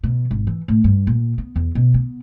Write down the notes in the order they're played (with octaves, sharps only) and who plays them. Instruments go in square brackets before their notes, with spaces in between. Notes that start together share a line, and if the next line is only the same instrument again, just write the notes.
[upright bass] B2
G#1
E3
A2
G2
A#2
B3
E2
B2
B3